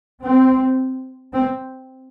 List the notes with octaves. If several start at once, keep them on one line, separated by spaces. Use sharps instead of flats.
C4
C4